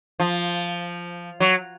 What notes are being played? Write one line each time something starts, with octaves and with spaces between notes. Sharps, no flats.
F3
F#3